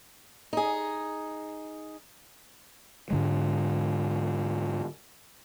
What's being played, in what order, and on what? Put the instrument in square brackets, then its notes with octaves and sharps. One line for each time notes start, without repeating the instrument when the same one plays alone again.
[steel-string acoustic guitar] D#4 G#4
[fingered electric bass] G#2 D3 G#3